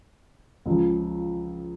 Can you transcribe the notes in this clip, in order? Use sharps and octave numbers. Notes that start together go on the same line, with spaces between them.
C#2 C#3 F3